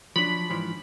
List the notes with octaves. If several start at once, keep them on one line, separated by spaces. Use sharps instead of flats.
F3 F#3 D4 B5
G#2 E3 F3